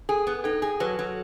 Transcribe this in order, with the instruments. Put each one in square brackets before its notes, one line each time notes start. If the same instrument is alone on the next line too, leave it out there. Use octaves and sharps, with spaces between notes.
[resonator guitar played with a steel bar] G#4 [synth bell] A4
[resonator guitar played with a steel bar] B3
[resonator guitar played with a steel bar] D#4 [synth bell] A4
[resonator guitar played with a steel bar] G#4
[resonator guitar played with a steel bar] F#3 [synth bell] B4
[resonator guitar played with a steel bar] F#3